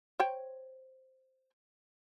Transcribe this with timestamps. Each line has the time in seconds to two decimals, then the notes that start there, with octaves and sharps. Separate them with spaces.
0.20 C5 C#5 G5